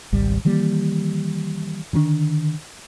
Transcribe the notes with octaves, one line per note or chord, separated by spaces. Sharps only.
G#1 C#2 G3
D#3 E3 G3 A#3
D3 D#3 B3 D4